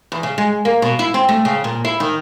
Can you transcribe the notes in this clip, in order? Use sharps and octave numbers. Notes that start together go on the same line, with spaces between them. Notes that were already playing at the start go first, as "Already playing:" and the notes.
E2
C#3
G#3
A#3
B2
E4
C4
A3
C#3
A#2
E4
D#3